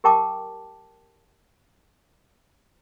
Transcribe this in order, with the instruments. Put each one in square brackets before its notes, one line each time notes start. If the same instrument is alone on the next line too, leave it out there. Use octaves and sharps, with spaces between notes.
[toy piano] G4 A#4 G5 A5 D6